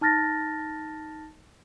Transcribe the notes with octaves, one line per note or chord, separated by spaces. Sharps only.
D#4 A5 F6 A6 A#6